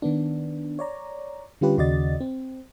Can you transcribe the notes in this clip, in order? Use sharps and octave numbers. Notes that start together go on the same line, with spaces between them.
D#3 B3 D4
C#5 D5 A#5
D3 G3 C#4 F4 G4 B4
D#2 C#3 F#4 D5 D#5 A6
C4